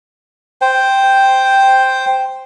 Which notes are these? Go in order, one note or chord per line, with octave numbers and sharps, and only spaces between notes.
C5 G5